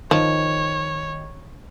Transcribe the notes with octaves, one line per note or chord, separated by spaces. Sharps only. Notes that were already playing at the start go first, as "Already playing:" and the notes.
D#3 F3 C#5